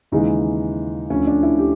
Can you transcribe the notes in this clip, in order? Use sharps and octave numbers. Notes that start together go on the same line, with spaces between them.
D#2 C#3 E3 G#3 D#4
D2 D3 F3 C#4
D4
E4
G4